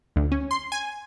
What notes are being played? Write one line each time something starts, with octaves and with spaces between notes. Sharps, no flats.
D2
C#4
C6
G#5